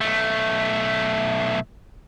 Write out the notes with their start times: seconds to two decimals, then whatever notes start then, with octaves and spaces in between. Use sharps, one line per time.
0.01 B1 A3